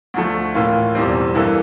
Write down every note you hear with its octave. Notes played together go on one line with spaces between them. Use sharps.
D2 D3 F3 A3
A2 E3 A#3 F4
E1 E2 E3 G3 C4
G2 E3 A#3 E4 A4